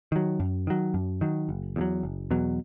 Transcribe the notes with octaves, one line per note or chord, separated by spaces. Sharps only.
D#3 F#3
F#2
D#3 F#3
F#2
D#3 F#3
F#1
E2 B2 F#3
F#1
E2 B2 F#3